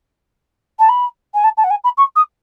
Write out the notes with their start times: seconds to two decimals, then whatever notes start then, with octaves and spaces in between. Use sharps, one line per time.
0.79 A5
0.89 B5
1.34 G#5
1.44 A5
1.57 A5
1.64 F#5
1.70 G#5
1.84 B5
1.97 C#6
2.16 D#6